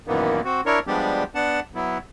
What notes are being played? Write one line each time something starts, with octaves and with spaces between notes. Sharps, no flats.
F#2 A#2 D#3 E3 A#3 B3
C4 F#4
D4 E4 A#4 C#5
F3 G3 G#3 B3 D4 G4
B3 D4 F#5 A5
F#3 B3 E4